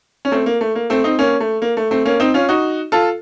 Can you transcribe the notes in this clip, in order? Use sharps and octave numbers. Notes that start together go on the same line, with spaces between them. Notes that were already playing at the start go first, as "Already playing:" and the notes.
C#4
A3 C4
A#3
A3
A#3
A3 C4
C4 D#4
A#3 C#4
A3
A#3
A3
A3 C4
A#3 C#4
C4 D#4
C#4 F4
D#4 F#4
F4 A4